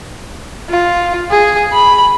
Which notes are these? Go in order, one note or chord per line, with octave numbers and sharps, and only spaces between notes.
F4
G#4
B5